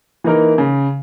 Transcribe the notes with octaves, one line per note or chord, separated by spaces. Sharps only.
E3 A#3 D#4 A#4
C#3